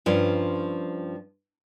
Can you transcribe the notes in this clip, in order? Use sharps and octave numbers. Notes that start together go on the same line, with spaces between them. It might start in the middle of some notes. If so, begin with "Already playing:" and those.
G2 F3 C#4 F4